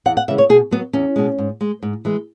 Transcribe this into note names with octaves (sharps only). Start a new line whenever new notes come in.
E2 F#5
F#5
C#3 E3 G#3 E5
C#5
B2 G#4
F#3 B3
E2 C#4
B2 G#3
G#2
G#3
G#2
E3 G#3